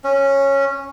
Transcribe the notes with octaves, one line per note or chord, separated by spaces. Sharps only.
C#4